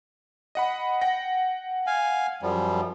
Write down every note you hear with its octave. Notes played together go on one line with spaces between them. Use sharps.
D#5 F#5 B5
F#5 G5 A#6
F5 G#5
F#2 F3 G3